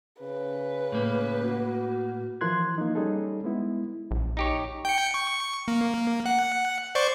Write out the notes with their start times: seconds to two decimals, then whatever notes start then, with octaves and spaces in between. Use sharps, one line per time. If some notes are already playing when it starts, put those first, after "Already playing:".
0.21 C#3 B4
0.92 A2 A#3
1.44 F#4
2.41 E3 F3 A#4 C6 F#6 G#6
2.78 A#3 D#4
2.95 G3 C#4 D#4 G#4 A4
3.44 G#3 B3 E4
4.11 A#1
4.37 D#4 G4 C#5
4.85 G5 C#7
5.14 C#6
5.68 A#3
6.26 F#5
6.95 C5 D5 C#6